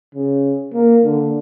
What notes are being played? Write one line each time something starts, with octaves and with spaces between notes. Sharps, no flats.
C#3
A#3
D3